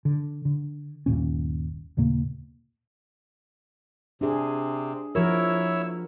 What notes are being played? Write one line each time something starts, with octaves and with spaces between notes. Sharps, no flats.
D3
D3
G1 D#2 A#2 C#4
D#2 A#2 C#3 A#3
C3 D4 G#4
F3 E4 F#4 A#4 C#5 E6